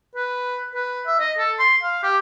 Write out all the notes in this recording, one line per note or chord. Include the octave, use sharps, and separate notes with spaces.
B4
B4
E5
D#5
A4
C6
F5
G4